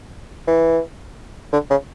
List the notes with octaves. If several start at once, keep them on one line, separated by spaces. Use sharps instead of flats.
E3
D3
C#3